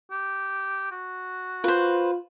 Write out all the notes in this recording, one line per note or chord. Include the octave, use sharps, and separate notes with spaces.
G4
F#4
F4 B4 C5